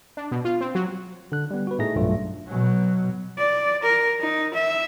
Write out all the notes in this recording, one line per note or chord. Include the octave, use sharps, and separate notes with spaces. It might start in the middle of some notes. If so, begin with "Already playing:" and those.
D4
B2
F4
C4
F#3
D3 F#6
G3 B3
F#4 B4
A2 A3 D#4 G#4 A#6
B1 G2 F#3 A3 F4
B2 F#3
D5
A#4
D#4
E5